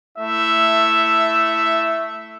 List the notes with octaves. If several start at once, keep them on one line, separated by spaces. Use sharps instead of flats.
A3 E4 E5